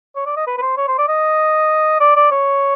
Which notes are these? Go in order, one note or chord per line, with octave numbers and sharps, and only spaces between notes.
C#5
D5
D#5
B4
B4
C5
C#5
C5
D5
D#5
D5
D5
C#5